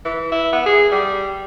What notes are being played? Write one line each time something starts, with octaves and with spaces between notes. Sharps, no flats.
E3
E4
B3
G#4
G3